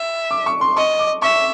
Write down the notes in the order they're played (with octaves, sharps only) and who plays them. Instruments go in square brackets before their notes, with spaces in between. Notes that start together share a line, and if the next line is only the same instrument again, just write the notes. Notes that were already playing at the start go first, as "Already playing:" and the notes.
Already playing: [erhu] E5
[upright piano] D6
C#6
C6
[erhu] D#5 [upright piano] C#6
[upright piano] D6
[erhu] E5 [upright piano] C#6